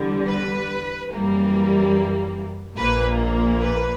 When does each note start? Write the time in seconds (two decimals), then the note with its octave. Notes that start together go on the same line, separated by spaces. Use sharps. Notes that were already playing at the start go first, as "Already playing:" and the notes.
Already playing: E2 D3 G3
0.27 B4
1.11 F#2 E3 G3 A#3
2.77 A#1 A#2 A#3 B4
3.60 B4